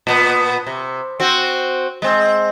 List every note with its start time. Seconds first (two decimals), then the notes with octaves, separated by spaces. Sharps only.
0.07 A#2 B3
0.67 C3
1.20 C4 F#4
2.02 G#3 C4